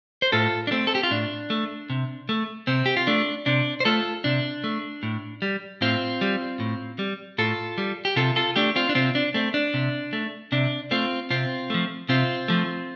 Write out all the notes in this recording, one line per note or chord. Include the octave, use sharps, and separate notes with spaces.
C5
A2 F4 A4
D4
A3 C4
A4
G4
F4
A2 D4
A3
C3
A3
C3 C4
G4
F4
A3 D4
C3 D4
C5
A3 F4 A4
C3 D4
A3
A2
G3
A2 C4 F4
G3
A2
G3
A2 F4 A4
G3
G4
C3 F4 A4
F4 A4
A3 D4 G4
C4 F4
D4
C3 C4 F4
D4
A3 C4
D4
C3
A3
C3 D4
A3 C4 F4
C3 C4 F4
F3 A3
C3 C4 F4
F3 A3